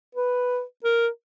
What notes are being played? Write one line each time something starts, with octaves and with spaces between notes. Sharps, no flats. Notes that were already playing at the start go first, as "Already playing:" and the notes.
B4
A#4